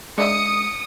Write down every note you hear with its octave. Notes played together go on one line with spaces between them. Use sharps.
G#3 D4 D#4 E5 D#6 C#7